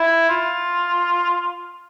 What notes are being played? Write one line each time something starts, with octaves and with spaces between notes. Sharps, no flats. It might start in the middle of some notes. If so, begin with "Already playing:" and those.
Already playing: E4
F4